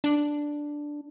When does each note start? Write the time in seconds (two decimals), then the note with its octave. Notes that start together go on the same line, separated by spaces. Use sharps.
0.04 D4